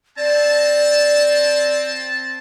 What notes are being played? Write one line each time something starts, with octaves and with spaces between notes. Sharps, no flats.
C4 D5 A5